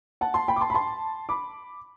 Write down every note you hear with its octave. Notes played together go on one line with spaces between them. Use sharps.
F#5 A5
A5 C6
G5 B5
D6
A5 C6
B5
A5 C6
B5 D6